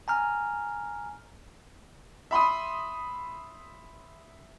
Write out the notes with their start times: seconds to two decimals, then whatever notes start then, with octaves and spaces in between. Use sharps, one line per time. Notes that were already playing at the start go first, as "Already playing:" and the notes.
0.08 G#5 A#5 F6
2.31 E5 B5 C6 D#6